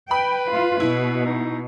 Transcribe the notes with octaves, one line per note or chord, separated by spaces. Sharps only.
B4 G5 B5
F4
B2 E4
D#4